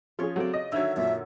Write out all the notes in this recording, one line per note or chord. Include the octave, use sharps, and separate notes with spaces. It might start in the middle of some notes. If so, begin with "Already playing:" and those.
F3 C#4 F4 G#4 C#5
C#3 F#3 A3 C4 D5
D#5
D3 D#3 F#3 E5 E6 G#6
F#2 A#2 E5